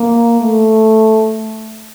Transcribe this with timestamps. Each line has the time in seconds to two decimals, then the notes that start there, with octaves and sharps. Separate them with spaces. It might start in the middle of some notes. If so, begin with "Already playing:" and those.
Already playing: A#3
0.40 A3